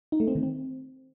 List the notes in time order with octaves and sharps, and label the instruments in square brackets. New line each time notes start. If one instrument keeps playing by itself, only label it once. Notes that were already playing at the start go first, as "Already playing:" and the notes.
[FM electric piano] D#4
A3
C4
D#3
C4